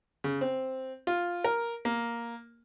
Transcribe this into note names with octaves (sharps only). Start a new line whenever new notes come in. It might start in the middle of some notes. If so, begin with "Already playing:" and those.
C#3
C4
F4
A#4
A#3